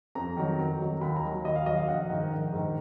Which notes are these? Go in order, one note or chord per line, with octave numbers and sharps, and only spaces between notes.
F2 A#5
D#3 F#3
F2
D#3 F#3
D#2 B5
A#5
D#3 F#3
D#2 D#5
F5
D#3 F#3 D#5
F5
A#1 F#5
G#2 D#3
A#1
G#2 D#3